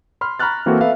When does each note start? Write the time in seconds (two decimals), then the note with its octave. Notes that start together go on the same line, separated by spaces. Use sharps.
0.21 B5 C6 F6
0.39 A#5 B5 C#6 F6 F#6 A6
0.66 E3 A#3 C4 E4 F#4 A4
0.81 B3 A4 B4 E5 F5